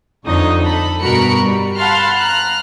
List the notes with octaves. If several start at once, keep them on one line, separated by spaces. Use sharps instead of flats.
F2 D3 D#4 C#5 D#5
A4 B5
G2 B2 F#4 A#4 B5 C#7
G3
F5 F#5 A5 B5 C6 F6
A#5 F6 F#6